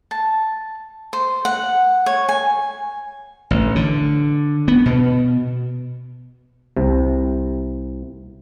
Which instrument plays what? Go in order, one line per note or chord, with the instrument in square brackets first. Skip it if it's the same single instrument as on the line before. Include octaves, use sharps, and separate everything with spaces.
[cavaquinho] A5
C5
F#5
C#5
G#5
[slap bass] A1
D3
B3
B2
[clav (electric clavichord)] C2 C3